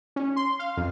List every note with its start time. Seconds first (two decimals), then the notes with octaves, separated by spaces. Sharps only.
0.16 C#4
0.36 C6
0.59 F5
0.77 F2